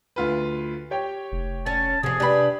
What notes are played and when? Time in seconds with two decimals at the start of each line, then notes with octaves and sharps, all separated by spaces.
0.16 D2 F4 B4
0.91 G4 C#5 G5
1.32 F1
1.66 C#4 A5
2.03 F2 C3 F3 G#4
2.20 D4 G4 B4 B5